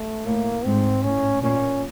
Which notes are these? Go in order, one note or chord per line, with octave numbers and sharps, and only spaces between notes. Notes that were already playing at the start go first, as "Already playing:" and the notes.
Already playing: A3
A2 A#3
G#2 C4
A2 C#4
A#2 C#4